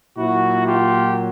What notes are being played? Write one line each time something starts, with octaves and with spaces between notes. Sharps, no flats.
A#2 F#3 E4 F#4
F4 G4